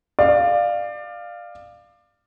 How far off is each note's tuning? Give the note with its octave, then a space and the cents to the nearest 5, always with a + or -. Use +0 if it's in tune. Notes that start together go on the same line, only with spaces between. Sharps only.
D5 +25 F5 +0